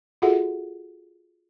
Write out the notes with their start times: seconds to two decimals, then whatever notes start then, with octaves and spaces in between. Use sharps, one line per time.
0.22 F4 F#4 G#4 A4 E5 F#5